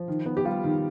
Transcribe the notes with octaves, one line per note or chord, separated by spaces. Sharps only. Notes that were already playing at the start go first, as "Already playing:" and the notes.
Already playing: F3
D#3
B3
G4
G3 F4
D#3